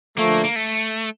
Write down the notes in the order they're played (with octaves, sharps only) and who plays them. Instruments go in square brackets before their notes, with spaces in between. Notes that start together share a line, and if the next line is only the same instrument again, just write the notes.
[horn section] D3 F3 A3 [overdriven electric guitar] A#3
[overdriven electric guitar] A#3
A3